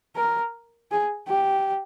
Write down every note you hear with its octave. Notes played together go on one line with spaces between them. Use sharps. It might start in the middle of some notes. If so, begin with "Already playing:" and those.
A#4
G#4
G4